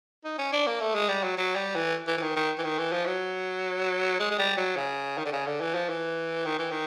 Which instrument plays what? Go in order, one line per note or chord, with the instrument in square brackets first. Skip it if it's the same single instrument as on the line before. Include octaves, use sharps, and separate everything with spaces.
[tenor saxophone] D#4
C#4
D4
A#3
A3
G#3
G3
F#3
F#3
G3
E3
E3
E3
D#3
D#3
E3
D#3
E3
F3
F#3
G#3
G#3
G3
F#3
C#3
D#3
D3
C#3
D3
E3
F3
E3
D#3
E3
D#3